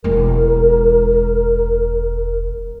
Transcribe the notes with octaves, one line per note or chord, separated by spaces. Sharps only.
E1 G#3 A#4